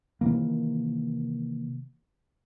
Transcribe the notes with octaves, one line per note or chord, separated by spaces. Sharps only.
C3 D#3 E3 A#3